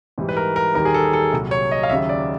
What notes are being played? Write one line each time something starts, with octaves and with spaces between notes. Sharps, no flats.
G#2 E3 G3
B4
A#4
A#4
D#2 D#3 G3 A#4
G#4
A4
A4
C2 A#2 F#3
C#5
D#5
F5
D#2 C#3 F#3 E5
D5